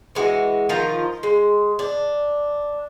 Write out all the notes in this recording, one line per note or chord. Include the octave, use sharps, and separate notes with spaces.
E3 G#3 F#4
D#3 F3 F4 A#5
G#3
D4